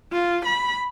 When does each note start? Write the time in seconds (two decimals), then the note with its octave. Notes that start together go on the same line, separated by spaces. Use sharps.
0.12 F4
0.45 B5